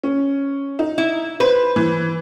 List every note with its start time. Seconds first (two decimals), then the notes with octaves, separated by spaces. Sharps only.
0.03 C#4
0.79 D#4
0.98 E4
1.40 B4 C5
1.76 E3